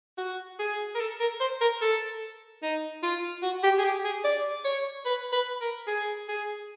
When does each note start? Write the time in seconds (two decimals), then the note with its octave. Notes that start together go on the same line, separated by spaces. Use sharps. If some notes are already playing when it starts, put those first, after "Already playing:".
0.18 F#4
0.59 G#4
0.95 A#4
1.00 A4
1.20 A#4
1.40 C5
1.61 A#4
1.81 A4
2.62 D#4
3.03 F4
3.43 F#4
3.63 G4
3.78 G#4
3.84 G4
4.04 G#4
4.24 D5
4.65 C#5
5.05 B4
5.32 B4
5.61 A#4
5.87 G#4
6.28 G#4